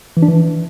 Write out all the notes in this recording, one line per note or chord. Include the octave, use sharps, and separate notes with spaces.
E3
D4
E3